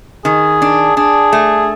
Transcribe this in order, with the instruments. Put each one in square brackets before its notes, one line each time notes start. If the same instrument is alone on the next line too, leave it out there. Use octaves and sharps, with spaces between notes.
[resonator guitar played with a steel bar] D#3 [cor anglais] G#4
[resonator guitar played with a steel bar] D4
[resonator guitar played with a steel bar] D4 [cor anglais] G#4
[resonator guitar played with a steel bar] A3